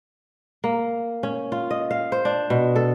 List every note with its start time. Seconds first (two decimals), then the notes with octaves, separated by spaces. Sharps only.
0.64 A#3
1.23 C#4
1.52 F4
1.71 D#5
1.91 F5
2.12 C5
2.25 D4
2.50 B2
2.76 A4